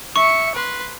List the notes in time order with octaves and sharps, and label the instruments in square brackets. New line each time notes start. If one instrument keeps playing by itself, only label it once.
[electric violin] E5 C#7 [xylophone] C#6
[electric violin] B4 C6